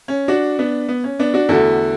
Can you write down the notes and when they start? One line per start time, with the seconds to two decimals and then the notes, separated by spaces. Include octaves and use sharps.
0.08 C#4
0.28 D4 F#4
0.59 B3 D4
0.88 B3
1.04 C#4
1.19 B3 D4
1.34 D4 F#4
1.49 E2 D3 A3 F#4 A4